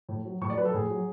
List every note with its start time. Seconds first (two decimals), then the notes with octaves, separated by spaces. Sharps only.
0.09 A2
0.25 F#3
0.41 A2 C#6
0.50 D5
0.57 F#3 B4
0.65 A4
0.74 A2 G#4
0.90 F#3